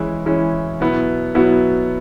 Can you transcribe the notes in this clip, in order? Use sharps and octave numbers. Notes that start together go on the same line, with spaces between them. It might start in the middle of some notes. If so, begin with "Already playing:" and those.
Already playing: E3 G#3 C#4 E4
E3 G#3 C#4 E4
B2 F#3 B3 E4
B2 F#3 B3 E4